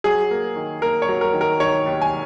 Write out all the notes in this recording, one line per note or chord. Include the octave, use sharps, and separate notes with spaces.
F#3 G#4
A#3
D#3
A#3 A#4
C#5
F#3
A#4
D#3
A#4
D#3 C#5
D#2
G#5